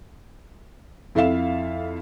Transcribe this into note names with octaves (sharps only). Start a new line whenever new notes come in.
F2 E4 A4 E5 F5 E7